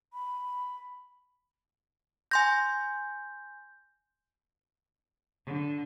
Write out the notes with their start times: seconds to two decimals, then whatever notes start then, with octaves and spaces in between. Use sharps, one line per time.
0.13 B5
2.31 G#5 C6 G6 A#6
5.47 D3